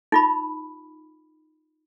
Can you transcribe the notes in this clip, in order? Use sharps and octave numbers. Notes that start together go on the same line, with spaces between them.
D#4 F4 B5